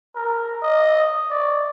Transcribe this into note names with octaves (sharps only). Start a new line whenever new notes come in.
A#4
D#5
D5